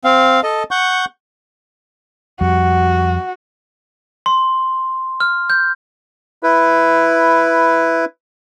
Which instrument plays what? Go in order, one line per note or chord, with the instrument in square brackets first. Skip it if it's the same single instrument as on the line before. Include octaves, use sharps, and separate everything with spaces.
[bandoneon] C4 F5
A4 D#5 A5
F#5 C#6 G6
[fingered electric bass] F2 G3 [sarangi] F#4
[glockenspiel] C6
F6
G6
[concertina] E4 B4